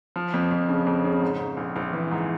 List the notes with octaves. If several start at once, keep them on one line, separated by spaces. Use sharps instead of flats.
F3
F2
F2
C#3
F2
C#3
G#2
G#2
A#1
A#1
E3
G#2